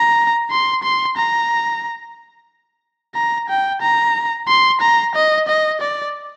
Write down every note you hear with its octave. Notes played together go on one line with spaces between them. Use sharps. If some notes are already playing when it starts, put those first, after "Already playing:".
Already playing: A#5
C6
C6
A#5
A#5
G5
A#5
C6
A#5
D#5
D#5
D5